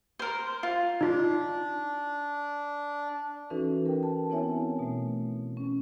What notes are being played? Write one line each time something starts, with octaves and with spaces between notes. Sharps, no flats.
A#4 C5
F4
D4 D#4 F4
E3 C#4 D#4 F#4 A4 B4
A#4 G5
A5
B3 C4 E4 C#5 E5 G#5
B2 A3
C#4